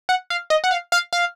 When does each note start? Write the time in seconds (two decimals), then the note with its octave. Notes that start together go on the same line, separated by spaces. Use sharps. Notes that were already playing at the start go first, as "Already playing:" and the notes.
0.09 F#5
0.30 F5
0.50 D#5
0.64 F#5
0.71 F5
0.92 F5
1.13 F5